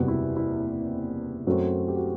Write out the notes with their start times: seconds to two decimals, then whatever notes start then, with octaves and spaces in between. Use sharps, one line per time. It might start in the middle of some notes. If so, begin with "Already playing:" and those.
Already playing: F#1 E2 C3 G3 B3 F#4
0.08 E4
0.36 E4
1.47 F#2 F#3 A3 C4 F#4
1.88 G4
1.96 F#4